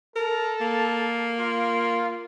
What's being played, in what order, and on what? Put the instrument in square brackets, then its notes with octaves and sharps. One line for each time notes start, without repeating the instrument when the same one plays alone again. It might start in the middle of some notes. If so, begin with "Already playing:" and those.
[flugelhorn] A4 [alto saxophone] A#4
[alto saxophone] A#3
[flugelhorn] F4